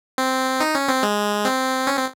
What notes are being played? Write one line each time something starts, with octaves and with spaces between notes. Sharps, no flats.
C4
D#4
C#4
C4
G#3
C4
C#4
C4